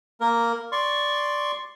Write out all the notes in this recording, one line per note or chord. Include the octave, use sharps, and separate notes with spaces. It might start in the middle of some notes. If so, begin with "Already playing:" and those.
A#3 A#4
D5 C6 C#6